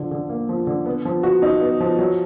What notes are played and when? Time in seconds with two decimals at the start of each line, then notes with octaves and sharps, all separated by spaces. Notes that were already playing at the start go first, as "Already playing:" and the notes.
Already playing: D3 F3
0.11 D3
0.29 A#3
0.49 F3
0.67 D3
0.86 B3
1.05 F3
1.23 F#4
1.42 D#4
1.61 B3
1.80 F3
1.99 F#3